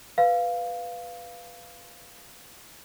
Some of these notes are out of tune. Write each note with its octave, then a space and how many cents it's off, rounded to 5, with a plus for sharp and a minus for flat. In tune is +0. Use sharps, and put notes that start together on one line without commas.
B4 +0 F5 +0